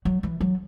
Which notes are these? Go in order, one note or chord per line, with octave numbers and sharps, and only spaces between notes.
F#3
E3
F#3